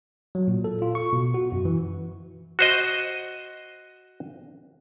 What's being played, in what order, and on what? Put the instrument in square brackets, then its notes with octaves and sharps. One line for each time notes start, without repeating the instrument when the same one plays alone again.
[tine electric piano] F#3
A#2
A4
F4
C#6
B2
F#4
F#2
E3
[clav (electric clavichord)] F#4 C5 D#5